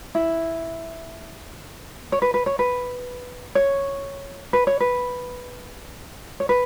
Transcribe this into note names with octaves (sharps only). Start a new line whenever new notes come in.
E4
C#5
B4
B4
C#5
B4
C#5
B4
C#5
B4
C#5
B4